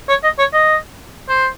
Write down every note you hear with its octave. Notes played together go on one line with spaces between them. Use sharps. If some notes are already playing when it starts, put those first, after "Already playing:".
C#5
D#5
C#5
D#5
C5